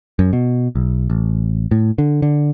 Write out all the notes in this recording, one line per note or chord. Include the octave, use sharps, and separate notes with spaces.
F#2
B2
B1
A1
A2
D3
D3